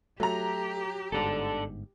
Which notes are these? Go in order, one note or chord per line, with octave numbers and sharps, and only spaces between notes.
F#3 A3 G4 A#5
G1 G#2 D4 A4